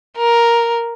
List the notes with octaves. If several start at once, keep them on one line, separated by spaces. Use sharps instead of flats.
A#4